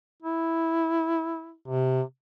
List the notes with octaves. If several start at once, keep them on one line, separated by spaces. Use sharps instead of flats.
E4
C3